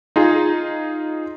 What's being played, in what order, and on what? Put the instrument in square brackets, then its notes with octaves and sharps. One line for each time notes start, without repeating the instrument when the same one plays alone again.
[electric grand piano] D#4 F4 G#4